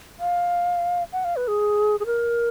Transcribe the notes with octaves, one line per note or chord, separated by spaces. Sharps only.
F5
F#5
F5
B4
G#4
G#4
A#4